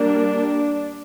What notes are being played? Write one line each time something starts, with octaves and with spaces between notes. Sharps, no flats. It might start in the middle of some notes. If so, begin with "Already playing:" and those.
Already playing: G3 A#3 D4